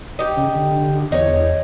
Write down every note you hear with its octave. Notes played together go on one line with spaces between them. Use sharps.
D#4 G4
C#3
D3
E2 D#4 C#5